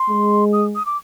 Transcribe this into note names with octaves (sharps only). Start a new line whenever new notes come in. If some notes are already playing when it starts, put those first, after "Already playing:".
Already playing: C6
G#3
D#6
D#6
D6